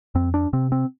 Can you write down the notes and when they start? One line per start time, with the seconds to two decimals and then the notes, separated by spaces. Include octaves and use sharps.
0.15 F2 C4
0.34 D4
0.53 C3 C4
0.72 C4